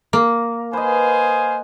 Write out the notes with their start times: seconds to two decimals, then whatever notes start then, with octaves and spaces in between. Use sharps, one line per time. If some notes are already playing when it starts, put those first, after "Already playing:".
0.13 A#3
0.73 B4 C5 D#5 F5 G#5